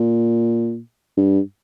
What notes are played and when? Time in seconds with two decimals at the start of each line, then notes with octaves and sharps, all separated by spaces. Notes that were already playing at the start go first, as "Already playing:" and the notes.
Already playing: A#2
1.17 G2